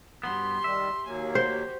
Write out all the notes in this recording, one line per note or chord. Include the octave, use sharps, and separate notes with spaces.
G2 F#3 B3 G4 C6
D#3 G3 E5
D#2 F#3 A#3 G#5
F#4 G4 C5